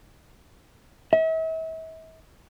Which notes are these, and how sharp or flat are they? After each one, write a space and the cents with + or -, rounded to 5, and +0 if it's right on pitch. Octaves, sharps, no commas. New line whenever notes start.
E5 -40